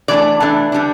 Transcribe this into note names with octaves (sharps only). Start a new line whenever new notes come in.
E3 A3 D4 D5
E3 A3 D4
D3 G3 D4